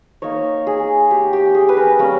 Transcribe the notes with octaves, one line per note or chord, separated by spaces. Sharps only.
A#3 D#4 C#5
G#4
G4
G4
G#4
B4
A#4
G3 A#3 C#4